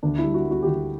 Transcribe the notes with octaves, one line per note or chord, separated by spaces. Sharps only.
D2 D4
E4
G3
F#4
G3
F#4
G4
D2 F#4